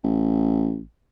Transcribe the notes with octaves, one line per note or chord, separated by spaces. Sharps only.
A1